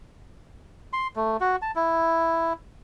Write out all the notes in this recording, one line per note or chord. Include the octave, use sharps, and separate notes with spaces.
C6
A3
F#4
A5
E4